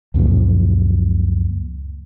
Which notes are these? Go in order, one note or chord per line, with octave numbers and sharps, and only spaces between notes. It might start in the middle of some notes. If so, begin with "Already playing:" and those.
C#2 F#2 A#2 F3